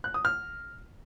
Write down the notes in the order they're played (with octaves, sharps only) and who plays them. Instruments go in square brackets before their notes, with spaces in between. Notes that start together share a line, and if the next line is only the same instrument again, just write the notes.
[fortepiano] F#6
D#6
F6